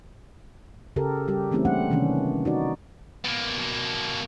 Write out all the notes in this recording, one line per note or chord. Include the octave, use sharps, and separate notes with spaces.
C#3 G4 A4 A#4
G3 G4
E3 A3 C4 C#4 E4 G4
G3 A#3 D4 F#5
C3 D#3 E3 A#3 C#4 D4
D#4 F#4 D5
B2 A#3